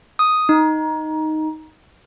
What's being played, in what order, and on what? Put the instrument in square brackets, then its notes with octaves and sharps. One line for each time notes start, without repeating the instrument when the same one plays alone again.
[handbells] D#6
D#4